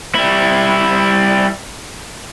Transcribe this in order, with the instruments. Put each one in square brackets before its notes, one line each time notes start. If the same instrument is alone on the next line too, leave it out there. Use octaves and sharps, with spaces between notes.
[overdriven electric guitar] G3 E4